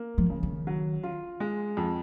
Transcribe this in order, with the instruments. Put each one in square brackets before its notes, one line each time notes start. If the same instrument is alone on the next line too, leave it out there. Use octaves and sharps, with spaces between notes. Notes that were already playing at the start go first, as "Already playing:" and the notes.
Already playing: [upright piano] A#3
[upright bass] F3
[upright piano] C#3
[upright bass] D#3
[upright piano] F#3
F4
G#3
F2